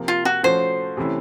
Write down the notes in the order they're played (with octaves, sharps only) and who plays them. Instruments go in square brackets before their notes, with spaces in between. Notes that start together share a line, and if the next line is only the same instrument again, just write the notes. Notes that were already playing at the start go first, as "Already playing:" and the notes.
Already playing: [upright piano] C3 F3 A#3
[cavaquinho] F4
F#4
[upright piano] F3 A3 C#4 F#4 [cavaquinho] C5
[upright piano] C3 E3 A3 C#4 E4